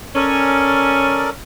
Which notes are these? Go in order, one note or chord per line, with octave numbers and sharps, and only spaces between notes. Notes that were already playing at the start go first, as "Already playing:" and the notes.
C#4 A4 A#4 D5